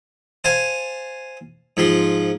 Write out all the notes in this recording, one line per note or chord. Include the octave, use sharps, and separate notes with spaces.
C5 F5 G#5 A5
G#2 F3 C6